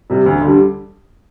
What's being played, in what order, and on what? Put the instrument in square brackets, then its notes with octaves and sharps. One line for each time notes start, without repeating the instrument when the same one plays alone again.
[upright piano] C3 G3
D2
D3
G3